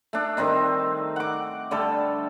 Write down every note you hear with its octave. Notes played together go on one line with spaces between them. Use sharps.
A3 D4
D#3 G3 C4 D#4
F#5 D6
D3 G3 A3 A4